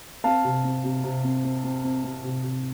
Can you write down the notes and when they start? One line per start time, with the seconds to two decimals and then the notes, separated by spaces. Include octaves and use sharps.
0.24 C4 F5 A5
0.44 C3
0.64 C4
0.84 C3
1.04 C3
1.24 C4
1.44 C4
1.63 C4
1.83 C4
2.03 C4
2.23 C3
2.43 C3